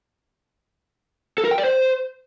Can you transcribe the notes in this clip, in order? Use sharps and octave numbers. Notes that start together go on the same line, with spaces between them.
A4
A#4
G5
D5
C5